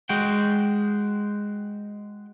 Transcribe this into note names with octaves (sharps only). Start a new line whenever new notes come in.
G#3 F#4 G5